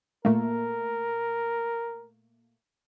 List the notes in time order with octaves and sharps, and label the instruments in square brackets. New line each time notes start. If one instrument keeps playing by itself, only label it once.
[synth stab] A#2 A3 A#3 [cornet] A#4